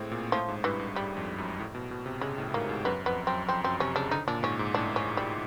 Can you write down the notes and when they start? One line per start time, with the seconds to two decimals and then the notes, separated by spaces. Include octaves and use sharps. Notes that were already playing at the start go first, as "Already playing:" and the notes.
Already playing: A2 G#3 C4
0.12 A#2
0.32 A2 F3
0.48 G#2
0.64 G2 E3
0.79 G2
0.95 G2 G3
1.17 F2
1.38 F#2
1.59 A2
1.75 B2
1.91 B2
2.06 C3
2.21 C#3 G#3
2.38 A2
2.49 A2
2.54 G#2 A#3
2.69 G#2
2.85 F#2 B3
3.06 F2 B3
3.27 F#2 C4
3.48 F2 C4
3.64 F#2 C4
3.80 C3 C#4
3.95 C#3 D4
4.11 D3 D#4
4.27 A#2 D4
4.43 G#2 C#4
4.59 G#2
4.74 A2 D4
4.96 C#4
5.17 G3